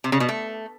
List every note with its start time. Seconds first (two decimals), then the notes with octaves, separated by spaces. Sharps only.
0.04 C3
0.12 C#3
0.20 B2
0.29 A3